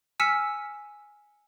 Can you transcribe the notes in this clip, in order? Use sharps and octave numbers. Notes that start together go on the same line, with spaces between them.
G#5 E6 F6 B6 C#7 E7